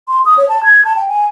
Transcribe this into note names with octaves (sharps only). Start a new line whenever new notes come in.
C6
D#6
C#5
A5
G#6
A5
G5
G#5